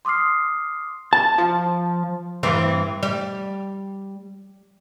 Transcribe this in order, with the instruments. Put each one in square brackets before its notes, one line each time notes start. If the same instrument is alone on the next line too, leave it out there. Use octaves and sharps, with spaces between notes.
[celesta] C6 D6 D#6 F6 C7
[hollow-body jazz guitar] A5
[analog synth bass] F3
[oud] G2 E3 C4
G3